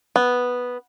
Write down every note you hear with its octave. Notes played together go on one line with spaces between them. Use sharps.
B3